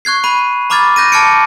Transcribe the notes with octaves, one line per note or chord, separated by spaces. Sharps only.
C#6 F#6 G#6 C7
B5 D#7
A#5 B5 D6 F6 G#6 A6
F#6 G6 A#6 D#7
A5 D6 F6 G#6 C#7 D7